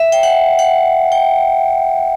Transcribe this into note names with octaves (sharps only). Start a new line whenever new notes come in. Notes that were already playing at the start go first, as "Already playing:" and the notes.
Already playing: E5
G5
F#5
F#5
G5